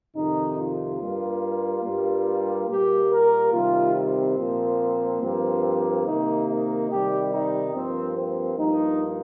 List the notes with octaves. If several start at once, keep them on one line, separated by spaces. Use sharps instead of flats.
F2 C3 D#3 D#4
F4
G2 G3 A#3
G2 G3 A#3
A#2 G3 A#3 G4
A#4
C3 D#3 G3 F4
C4
A#2 F3 A#3
G2 F3 A#3
C3 D#3 A#3 D#4
D#4
C3 D#3 G3 G4
D#4
G2 F3 A#3 C4
C4
G2 F3 A#3 D#4